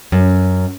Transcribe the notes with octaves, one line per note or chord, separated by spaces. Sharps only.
F#2